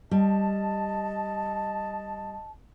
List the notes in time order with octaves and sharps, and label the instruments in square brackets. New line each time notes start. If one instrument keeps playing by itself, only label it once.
[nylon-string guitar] G3 [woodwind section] D#5 A5